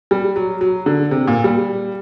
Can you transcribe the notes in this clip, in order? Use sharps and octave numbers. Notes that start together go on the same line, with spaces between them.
G3
F#3
F#3
D3
C3
A#2
G3